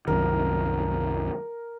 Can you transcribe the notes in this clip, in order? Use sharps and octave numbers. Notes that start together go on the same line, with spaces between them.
C2 F#2 D#3 A#4